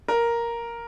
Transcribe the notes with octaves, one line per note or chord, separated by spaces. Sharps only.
A#4